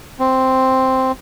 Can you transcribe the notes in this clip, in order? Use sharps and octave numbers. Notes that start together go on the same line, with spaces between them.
C4